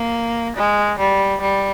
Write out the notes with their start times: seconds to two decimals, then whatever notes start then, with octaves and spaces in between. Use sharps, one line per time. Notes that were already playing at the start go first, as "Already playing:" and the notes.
Already playing: A#3
0.57 G#3
0.99 G3
1.41 G3